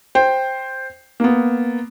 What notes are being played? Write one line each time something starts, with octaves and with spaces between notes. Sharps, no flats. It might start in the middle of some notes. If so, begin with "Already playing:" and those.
C5 G5
A#3 B3